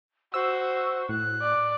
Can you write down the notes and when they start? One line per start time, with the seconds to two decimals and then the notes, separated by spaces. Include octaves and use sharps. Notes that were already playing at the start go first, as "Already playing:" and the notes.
0.34 F#4 C5 E6
1.09 A2 F#6
1.42 D5